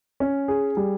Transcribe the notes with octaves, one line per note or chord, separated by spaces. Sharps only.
C#4
G#4
G3